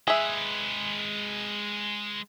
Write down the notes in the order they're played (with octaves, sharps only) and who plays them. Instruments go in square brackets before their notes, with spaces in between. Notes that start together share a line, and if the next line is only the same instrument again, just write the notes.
[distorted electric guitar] G#3 B4 [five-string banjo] G#4 E5